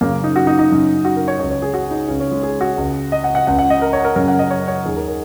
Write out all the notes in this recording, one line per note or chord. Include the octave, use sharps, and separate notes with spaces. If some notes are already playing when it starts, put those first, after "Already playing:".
F#2 C#3 A#3
D#4
F#4
D#4
D#4
F#2 C#3
F#4
A#4
C#5
C#2 C#3 C#5
C#5
G#4
F#4
D#4
C#2 C#3 C#4
C#4
G#3
G#4
F#4
C#2 C#3
D#5
F#5
F#5
C#2 C#3 F#5
F#5
D#5
A#4
C#5
A#4
F#2 C#3 A#4
F#5
D#5
C#5
C#5
D#2 D#3 G#4
A#4
A#4